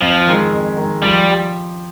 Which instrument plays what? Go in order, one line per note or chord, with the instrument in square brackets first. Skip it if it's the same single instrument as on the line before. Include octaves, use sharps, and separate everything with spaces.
[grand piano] F2 [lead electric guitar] F3
[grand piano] D#3 G#3
F2
D#3 G#3
[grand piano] F3 [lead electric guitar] G3
[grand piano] G4